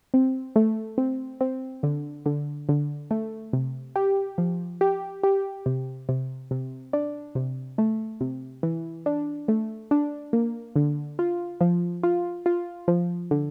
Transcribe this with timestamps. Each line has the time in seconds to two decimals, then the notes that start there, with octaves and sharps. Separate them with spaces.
0.14 C4
0.56 A3
0.98 C4
1.41 C4
1.83 D3
2.26 D3
2.69 D3
3.11 A3
3.53 C3
3.96 G4
4.38 F3
4.81 G4
5.23 G4
5.66 C3
6.09 C3
6.51 C3
6.93 D4
7.35 C3
7.78 A3
8.21 C3
8.63 E3
9.06 D4
9.48 A3
9.91 D4
10.33 A#3
10.76 D3
11.19 F4
11.61 F3
12.03 F4
12.46 F4
12.88 F3
13.31 D3